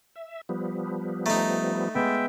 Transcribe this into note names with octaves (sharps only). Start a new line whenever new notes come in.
E5
F3 G3 B3
A3 D#4 A#5 D#6
G#3 B3 E5 G5